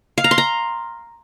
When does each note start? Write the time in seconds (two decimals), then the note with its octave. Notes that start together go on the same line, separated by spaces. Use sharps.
0.18 F5
0.24 A#5
0.31 C6
0.38 A#5